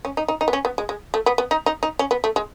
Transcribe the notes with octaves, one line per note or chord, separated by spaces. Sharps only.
C#4
D#4
D#4
D#4
B3
C#4
B3
G#3
G#3
A3
B3
B3
D#4
D#4
D#4
C#4
B3
A3
G#3